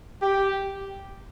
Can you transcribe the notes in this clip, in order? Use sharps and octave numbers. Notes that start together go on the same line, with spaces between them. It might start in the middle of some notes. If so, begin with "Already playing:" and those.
G4